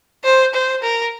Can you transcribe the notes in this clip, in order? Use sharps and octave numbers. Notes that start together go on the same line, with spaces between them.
C5
C5
A#4